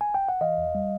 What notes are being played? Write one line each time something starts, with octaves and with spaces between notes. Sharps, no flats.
G#5
G5
F#5
E3 D#5 F5
E2
G3